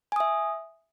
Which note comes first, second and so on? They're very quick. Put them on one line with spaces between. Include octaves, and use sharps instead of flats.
G#5 D#6 E5